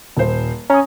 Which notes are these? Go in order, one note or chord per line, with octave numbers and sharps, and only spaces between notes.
D#1 C5
C#4 A#5 D#6